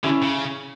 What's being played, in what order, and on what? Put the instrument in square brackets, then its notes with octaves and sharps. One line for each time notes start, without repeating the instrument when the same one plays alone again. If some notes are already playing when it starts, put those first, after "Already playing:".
[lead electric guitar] D3 [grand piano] C#4 E4
[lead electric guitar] C#3